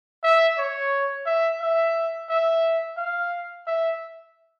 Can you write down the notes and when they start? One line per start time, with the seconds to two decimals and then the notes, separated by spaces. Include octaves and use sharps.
0.23 E5
0.58 C#5
1.26 E5
1.61 E5
2.30 E5
2.98 F5
3.67 E5